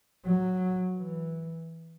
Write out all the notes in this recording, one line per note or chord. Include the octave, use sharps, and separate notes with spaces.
F#3
E3